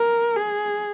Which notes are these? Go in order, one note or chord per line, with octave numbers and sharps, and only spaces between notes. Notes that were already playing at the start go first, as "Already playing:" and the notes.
Already playing: A#4
G#4